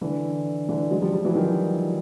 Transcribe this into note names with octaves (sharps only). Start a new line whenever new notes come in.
D3 E3
D3 E3
F#3 G#3
F3 G3
F3 G3
E3 F#3
D#3 F3